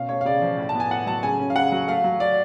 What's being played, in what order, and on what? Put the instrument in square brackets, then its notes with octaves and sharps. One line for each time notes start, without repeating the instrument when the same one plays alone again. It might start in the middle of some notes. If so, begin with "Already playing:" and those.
Already playing: [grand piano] B2 C#4 F5
A3 C#5
F5
C#3 D5
F3
A2
A5
B3
G#5
A2 F#5
F#3 A5
C#3 G#5
C#4
F5
C#3 F#5
F#3
A3 F5
F#3
D5